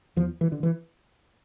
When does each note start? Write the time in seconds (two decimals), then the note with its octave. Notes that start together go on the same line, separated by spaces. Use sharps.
0.16 E2 F3
0.41 E3
0.52 D3
0.63 E3